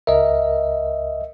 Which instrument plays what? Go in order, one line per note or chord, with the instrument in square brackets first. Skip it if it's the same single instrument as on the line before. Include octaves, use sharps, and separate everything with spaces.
[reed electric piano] C#2 A#4 [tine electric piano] D#5 E5